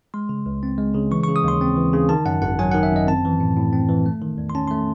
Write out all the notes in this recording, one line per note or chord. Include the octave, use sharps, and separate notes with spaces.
G#3 C6
C#3
C#2
C4
G#3
C#3
E3 C#6
C#6
C#3
D#6
D#2 C6
C4
E3
C#3
D#3 A5
F#2 F#5
G#1 F#5
F#3 G#5
D#3 F#5
E5
F#2 D#5
C4 A5
E3
A2
A2
C4
E3
A3
D#3
E2
C6
C#4 A5
A3 C6